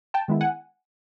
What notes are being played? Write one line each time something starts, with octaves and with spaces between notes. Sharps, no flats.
G5 A5
D#3 G#3 B3 E4
F#5 G#5